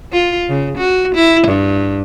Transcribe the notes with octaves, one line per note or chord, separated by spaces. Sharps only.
F4
C#3
F#4
E4
G2